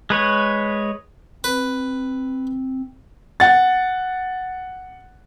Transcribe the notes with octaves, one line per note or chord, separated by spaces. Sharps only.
G#3 B4 C#5
C4 B4
F#5 A6